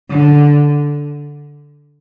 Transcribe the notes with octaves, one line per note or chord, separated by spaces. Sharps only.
D3